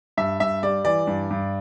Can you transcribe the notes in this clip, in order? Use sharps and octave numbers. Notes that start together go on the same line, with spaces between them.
G2 E5
G2 E5
G3 D5
E3 D5
G2
G2